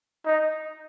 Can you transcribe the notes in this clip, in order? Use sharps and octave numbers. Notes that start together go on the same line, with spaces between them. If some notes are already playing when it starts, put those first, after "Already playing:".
D#4